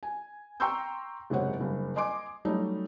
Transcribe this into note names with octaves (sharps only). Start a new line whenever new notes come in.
G#5
G5 A#5 C6 C#6 E6 G6
F#1 G#2 C3 G#3 C#5 F#5
F#1 G2
D#5 G#5 C6 D6
F#3 G3 A3 C#4 D#4